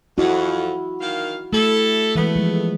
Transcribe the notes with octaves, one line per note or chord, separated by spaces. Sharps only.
F2 E4 F#4
D#3 A#3 F5
A3 E4 G4 A4
E3 G#3 A3 B3
F3 G#3